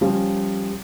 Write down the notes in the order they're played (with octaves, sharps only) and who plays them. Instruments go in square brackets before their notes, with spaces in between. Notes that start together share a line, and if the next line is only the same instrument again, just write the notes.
[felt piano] F3 G3 C#4